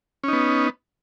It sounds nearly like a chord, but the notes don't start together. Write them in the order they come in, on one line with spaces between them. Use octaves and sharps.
C#4 D#4 B3